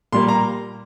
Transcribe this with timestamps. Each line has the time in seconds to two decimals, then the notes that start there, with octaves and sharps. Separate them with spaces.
0.13 A#2 G3 A#3 C6
0.29 A#5